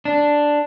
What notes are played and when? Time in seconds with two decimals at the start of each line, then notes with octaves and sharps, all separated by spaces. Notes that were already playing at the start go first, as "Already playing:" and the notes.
0.05 D4